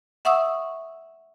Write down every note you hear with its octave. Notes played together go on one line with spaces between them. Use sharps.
E5 F#5 C#6 D#6 E6